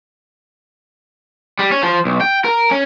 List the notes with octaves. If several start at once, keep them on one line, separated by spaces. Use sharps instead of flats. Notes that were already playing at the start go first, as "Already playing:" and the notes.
G3
C#4
F3
B1
G5
A#4
C#4